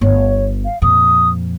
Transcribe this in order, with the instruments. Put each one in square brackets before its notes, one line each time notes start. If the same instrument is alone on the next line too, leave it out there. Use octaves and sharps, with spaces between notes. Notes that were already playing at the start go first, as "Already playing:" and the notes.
[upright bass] G1 B3 [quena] C#5
[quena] F5
[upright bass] F2 A#2 [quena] D#6